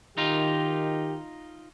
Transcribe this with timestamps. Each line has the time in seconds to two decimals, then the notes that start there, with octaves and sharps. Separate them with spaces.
0.18 D#3 D#4 F4 G4